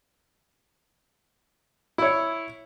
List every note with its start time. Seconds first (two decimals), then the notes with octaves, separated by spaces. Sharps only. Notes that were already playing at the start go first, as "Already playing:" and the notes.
1.98 E4 C#5